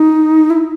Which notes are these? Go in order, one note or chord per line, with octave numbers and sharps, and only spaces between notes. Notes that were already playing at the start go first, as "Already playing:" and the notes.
Already playing: D#4
E4